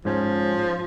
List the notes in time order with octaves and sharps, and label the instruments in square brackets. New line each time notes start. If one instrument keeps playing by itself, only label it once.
[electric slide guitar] G#2 C#4 [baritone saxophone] F3